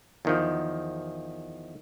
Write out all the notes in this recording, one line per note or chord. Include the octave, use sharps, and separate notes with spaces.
E2 D#3 F3